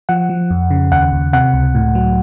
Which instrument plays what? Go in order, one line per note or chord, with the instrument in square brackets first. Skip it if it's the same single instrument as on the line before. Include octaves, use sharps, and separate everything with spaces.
[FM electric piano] F3 F#5
F3
F2
C#3
D#2 F#5
D#2
C3 F#5
C#2
A2
F#3